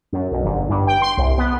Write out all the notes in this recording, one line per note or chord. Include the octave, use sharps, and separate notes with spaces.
F#2
B1
G1
G2
G5
C6
C2
B3